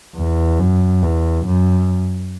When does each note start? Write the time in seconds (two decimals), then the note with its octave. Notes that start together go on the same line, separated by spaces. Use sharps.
0.17 E2
0.60 F#2
1.03 E2
1.46 F#2